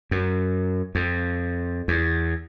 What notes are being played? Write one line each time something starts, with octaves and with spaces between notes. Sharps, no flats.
F#2
F2
E2